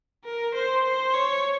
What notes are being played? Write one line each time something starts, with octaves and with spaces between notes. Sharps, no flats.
A#4
C5
C5
C#5